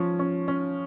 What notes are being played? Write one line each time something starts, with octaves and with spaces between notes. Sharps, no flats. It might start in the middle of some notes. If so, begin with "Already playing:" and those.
Already playing: F3 C#4
C#4
C#4